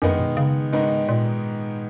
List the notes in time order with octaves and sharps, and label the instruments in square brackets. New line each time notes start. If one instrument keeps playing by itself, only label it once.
[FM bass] F#2 [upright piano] D#3 G#3 B3 D#4
[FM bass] B2
C#3
[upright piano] G#2 D#3 G#3 B3 D#4
[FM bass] A#2